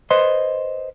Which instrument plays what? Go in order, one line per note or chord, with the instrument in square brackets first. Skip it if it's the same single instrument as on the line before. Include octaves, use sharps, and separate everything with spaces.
[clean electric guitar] B4 C5 D#5 C6